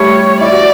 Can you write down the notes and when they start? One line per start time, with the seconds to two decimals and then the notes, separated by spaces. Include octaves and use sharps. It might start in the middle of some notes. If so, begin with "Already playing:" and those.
Already playing: G3 A3 C#5
0.41 E4 D5
0.51 F#4